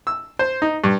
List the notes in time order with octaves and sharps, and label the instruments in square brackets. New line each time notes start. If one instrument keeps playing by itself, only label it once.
[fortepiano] E6
C5
D#4
G2